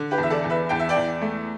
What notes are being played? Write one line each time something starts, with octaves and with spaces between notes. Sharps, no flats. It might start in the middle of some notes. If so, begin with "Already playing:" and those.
Already playing: D3
G4 B4
E2
E5
A4 D5
E2
B4 E5
E2 G5
E5
D5 G5
E2
A3